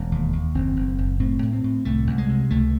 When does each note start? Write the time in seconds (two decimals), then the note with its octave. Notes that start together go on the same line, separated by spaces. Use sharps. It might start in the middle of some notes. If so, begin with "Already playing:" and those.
Already playing: E1 C#4
0.12 D#2
0.33 D#2
0.54 F#1 C4
0.76 F#1
0.98 F#1
1.20 A2 C4
1.42 A2
1.53 C4
1.64 A2
1.85 C2 A3
2.07 C2
2.18 G#3
2.29 C3
2.50 C#2 A3